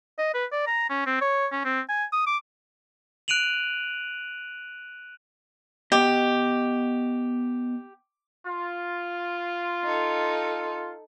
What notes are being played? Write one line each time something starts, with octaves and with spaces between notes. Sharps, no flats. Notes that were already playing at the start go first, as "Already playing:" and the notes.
D#5
B4
D5
A#5
C#4
C4
C#5
C#4
C4
G#5
D#6
D6
F#6 D7 D#7 F7 F#7
B3 G4 D#5
F4
D#4 A4